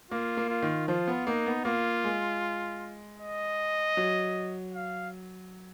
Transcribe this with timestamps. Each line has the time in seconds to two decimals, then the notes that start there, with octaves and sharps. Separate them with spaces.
0.11 A#3 F4
0.37 A#3
0.49 F4
0.62 D#3
0.88 F3 F4
1.08 B3
1.27 A#3 D#4
1.46 B3
1.65 A#3 F4
2.04 G#3
3.19 D#5
3.97 F#3
4.74 F5